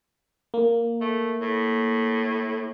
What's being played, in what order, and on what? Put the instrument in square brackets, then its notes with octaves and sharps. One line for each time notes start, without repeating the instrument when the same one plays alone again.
[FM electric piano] A#3
[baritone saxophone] A3
A2